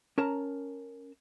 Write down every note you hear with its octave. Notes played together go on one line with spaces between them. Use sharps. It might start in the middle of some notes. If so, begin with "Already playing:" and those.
C#4 A#4 A5 A#5